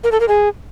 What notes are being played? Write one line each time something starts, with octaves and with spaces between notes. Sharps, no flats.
A#4
A4
A#4
G#4